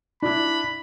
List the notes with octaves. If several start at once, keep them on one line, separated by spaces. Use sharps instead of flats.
D4 E4 B5